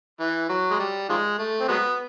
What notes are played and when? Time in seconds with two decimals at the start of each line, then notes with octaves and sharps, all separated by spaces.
0.20 E3
0.49 F#3
0.70 G#3
0.79 G3
1.09 D#3 F3 G#3
1.39 A3
1.60 C4
1.68 F#3 G#3 B3